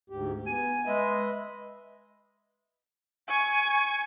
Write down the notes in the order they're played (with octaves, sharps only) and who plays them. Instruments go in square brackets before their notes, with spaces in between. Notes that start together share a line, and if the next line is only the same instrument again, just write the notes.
[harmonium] D2 G#2 G4
[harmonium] B3 [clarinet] G#5
[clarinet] G#3 [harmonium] B4 D#5 E5
[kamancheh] G#5 C#6